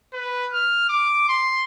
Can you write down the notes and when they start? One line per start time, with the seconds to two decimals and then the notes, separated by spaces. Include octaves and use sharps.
0.13 B4
0.53 F6
0.89 D6
1.29 C6